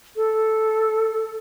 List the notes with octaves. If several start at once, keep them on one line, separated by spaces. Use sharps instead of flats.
A4